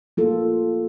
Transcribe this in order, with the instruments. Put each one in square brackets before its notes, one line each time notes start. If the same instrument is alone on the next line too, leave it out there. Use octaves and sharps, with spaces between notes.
[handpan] A#3 F4 A4